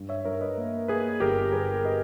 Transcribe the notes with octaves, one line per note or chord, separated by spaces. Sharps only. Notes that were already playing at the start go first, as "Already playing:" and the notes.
Already playing: G2
C#5 E5
G2 A#4 C#5
B4 D#5
A#3
A#3 G#4 B4
G1 G4 A#4
G1 G#4 B4
B4 D#5